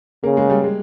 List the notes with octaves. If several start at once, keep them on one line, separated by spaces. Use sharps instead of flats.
C#3 A#3
G#3
G3
G#3